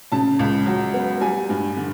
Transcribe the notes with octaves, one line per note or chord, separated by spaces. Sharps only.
C#3 A5
C#2
F#3
B3
G3 G#5
G2
D3